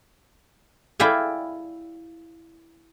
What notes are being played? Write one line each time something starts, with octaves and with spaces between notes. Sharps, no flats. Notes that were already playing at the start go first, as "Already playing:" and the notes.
E4 D5 E5 F5 G5 G#5